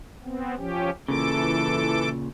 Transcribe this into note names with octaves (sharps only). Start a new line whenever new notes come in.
B3 C4
F3 C#4 G4
A#2 C#3 E3 A4 D6